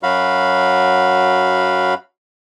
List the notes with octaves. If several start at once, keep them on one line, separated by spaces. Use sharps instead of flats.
F#2 F#3 F#4 F5 B5